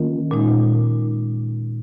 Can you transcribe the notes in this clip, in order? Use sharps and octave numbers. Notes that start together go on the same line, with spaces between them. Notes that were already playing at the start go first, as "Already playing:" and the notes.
Already playing: D#3 A#3 C#4 F4 A#4
A#2 G#3 D#4